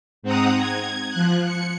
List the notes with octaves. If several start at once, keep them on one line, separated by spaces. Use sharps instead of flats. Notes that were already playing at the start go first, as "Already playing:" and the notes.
G#2 C4 F#5 A#5 D#6
G#6
F3 F#6
C#7